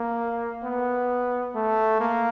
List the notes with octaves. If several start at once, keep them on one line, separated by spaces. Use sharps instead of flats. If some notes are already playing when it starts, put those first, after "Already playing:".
Already playing: A#3
B3
A3
A#3